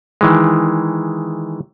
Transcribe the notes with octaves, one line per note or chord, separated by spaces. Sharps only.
D#3 E3 G#3